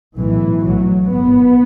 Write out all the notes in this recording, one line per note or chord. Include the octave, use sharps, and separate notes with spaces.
B1 A2 E3
B1 A2 F#3
G#1 G#2 B3